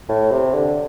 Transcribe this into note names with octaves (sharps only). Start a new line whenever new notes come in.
A2
C3
D3